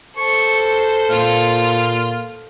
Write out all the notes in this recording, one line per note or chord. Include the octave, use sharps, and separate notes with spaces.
A4 C5 C#6
A#2 F4 F5